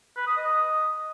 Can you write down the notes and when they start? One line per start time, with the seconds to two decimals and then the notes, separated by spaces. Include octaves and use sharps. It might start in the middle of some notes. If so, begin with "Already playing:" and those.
0.16 B4
0.27 D#6
0.37 D#5